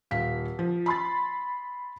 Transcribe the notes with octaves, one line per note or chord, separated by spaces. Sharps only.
D#1 F5 B6
F3
B5 C6 A6